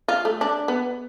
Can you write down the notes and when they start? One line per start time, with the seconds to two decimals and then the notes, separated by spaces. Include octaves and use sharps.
0.08 F4
0.25 A3
0.41 D4
0.68 B3